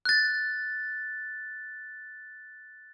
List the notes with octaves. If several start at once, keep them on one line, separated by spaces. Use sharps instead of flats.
F#6 A6